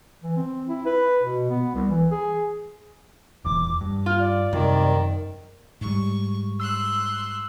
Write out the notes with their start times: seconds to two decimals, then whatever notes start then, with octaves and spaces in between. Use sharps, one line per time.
0.23 E3
0.36 C4
0.68 E4
0.85 B4
1.22 B2
1.50 B3
1.75 C2
1.88 E3
2.11 G#4
3.45 D#1 E2 D6
3.81 G2
4.06 F4 F6
4.19 D5
4.53 C2 F#2 D#3
5.81 G#2 G3 C#6
6.60 C6 E6 F#6